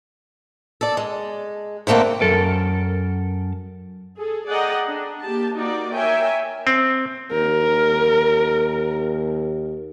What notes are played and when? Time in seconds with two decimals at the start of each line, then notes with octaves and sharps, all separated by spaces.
0.81 A4 D5
0.97 G#3
1.87 G#2 D3 A3 A#3 C4
2.21 F#2 A4 A#4
4.17 G#4 A4
4.47 G#4 D5 D#5 F#5 G5 A#5
4.87 D4
5.22 A#3 G4 A5
5.55 A#3 D#4 F#4 D5
5.93 A#4 C#5 E5 G5 G#5
6.67 C4
7.31 D#2 A#4